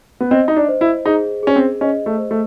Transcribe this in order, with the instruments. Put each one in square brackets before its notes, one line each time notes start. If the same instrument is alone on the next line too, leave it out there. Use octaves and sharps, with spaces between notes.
[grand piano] B3
[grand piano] C4 [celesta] D#5
[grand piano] D#4
D4
[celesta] C5
[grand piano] E4
[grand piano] D#4 [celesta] G#4
[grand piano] C#4 [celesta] G#4
[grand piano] C4
[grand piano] C#4 [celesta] D#5
[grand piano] A3
[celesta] C5
[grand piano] A3